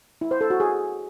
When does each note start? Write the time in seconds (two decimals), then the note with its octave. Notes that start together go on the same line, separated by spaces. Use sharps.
0.21 E4
0.31 C5
0.41 A4
0.50 F#4
0.60 G#4